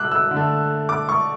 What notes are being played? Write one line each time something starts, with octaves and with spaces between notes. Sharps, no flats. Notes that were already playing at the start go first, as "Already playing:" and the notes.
Already playing: B2 D6 E6 F#6
E6
D3
A3
D6
C#6